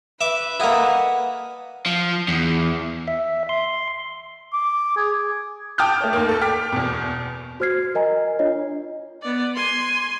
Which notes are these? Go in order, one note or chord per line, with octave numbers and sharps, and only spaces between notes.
B4 E5 D6
A#3 E4 A4 D#5 F#5
F3
E2
E5
C6
D6
G#4
G5 A5 D6 D#6 F6 G6
A3 C#5
D#2 A#3
A4
G5 D6 F6 B6
E2 B2
F#4 C5 F6 G#6 C7
A#4 D#5 G#5 A#5
D4 F4 C#5 D#5
B3 D5
G#5 C6